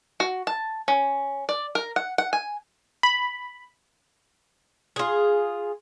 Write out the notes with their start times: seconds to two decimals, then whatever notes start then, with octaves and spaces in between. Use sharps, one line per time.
0.20 F#4
0.47 A5
0.88 C#4
1.49 D5
1.75 A#4
1.96 F#5
2.18 F#5
2.33 G#5
3.03 B5
4.96 F4 G#4